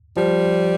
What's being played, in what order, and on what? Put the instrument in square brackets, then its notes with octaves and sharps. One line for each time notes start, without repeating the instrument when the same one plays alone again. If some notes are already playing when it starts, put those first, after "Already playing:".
[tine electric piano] F3 [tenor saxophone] G3